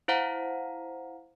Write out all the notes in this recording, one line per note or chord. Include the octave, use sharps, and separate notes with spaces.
E4 C5 F5 F#5 A#5